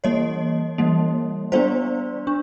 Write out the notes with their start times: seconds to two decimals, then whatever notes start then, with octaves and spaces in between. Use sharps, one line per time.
0.04 E3 G3 A#3 C#5 D#5
0.78 E3 G3 A#3
1.52 G3 B3 D4 C5 D5
2.27 D4